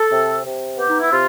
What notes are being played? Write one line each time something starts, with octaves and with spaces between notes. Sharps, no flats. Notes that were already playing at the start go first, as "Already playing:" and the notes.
Already playing: A4
C3
C3
B3 G4
D#4
E4
C3 F4